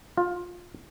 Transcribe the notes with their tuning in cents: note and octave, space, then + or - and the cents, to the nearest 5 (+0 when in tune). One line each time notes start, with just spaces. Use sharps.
F4 +15